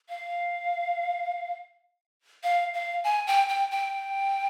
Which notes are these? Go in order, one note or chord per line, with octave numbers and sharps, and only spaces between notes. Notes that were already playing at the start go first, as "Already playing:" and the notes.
F5
F5
F5
G#5
G5
G5
G5